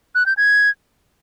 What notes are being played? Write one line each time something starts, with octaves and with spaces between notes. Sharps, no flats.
F#6
G6
G#6